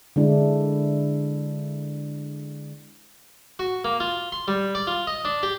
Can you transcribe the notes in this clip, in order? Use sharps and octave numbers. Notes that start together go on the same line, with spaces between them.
D3 G#3 D4 E4
F#4
A#3
F4
C6
G3
D5
F4
D#5
D4
G4